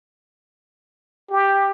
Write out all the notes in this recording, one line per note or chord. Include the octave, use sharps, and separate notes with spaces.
G4